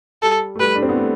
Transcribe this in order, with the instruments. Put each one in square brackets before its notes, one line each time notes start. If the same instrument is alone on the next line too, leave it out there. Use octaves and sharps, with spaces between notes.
[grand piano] G3 [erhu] A4
[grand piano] A3
[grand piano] G3 [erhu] B4
[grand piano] D4
C4
B3
A3